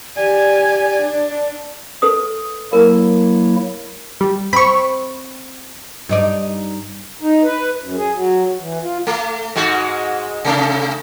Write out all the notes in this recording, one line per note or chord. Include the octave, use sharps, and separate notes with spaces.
G4 D5 G#5
D4
A4 B4 D#6
F#3 A#3 E4 A#4 A#5
G3
C4 B5 C#6
G2 D#4 D5
D#4
B4
F#2
G#4
F#3
E3
F4
A3
G#2 G#3 F#4
C3 A3